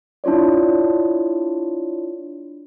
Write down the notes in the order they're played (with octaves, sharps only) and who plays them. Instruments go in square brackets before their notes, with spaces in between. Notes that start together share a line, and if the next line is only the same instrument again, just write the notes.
[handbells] D4 E4 F4 C#5 D5